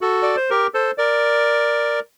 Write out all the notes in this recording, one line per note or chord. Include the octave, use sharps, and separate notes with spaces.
F#4 A4
D5
C5
G4 A#4
A4 C5
A#4 D5